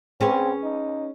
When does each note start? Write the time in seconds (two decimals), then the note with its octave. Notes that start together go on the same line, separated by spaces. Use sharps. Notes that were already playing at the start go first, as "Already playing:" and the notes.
0.21 C4 C#4 G#4 B4
0.64 D#4